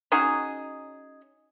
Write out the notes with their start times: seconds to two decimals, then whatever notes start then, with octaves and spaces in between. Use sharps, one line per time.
0.12 C#4 D#4 F#4 G#4